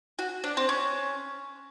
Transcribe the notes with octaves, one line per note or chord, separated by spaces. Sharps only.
F#4
D4
C4
C#4